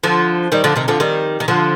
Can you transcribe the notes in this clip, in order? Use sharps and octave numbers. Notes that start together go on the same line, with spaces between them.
D3 F3
D#3 G3
D3 F3
C3 D#3
D3 F3
D#3 G3
D#3
D3 F3